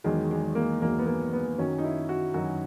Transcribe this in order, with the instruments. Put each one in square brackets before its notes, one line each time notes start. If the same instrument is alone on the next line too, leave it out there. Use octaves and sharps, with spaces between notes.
[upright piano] E2 D#3 F#3 G#3
G#3
A#3
E2 D#3 F#3 A#3
B3
A#3
B3
F#2 D#3 F#3 C#4
D#4
E4
F#4
F#2 D#3 F#3 F#4